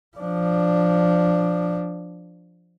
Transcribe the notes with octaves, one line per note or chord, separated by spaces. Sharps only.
F3 D4